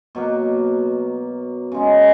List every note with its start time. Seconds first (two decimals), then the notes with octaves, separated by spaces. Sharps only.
0.15 B2 F#3 A#3
1.72 C#3 G#3 D#4